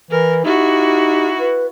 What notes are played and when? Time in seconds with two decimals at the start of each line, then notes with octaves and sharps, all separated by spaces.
0.11 E3 A#4
0.45 D#4 E4 F#4 G4
1.39 B4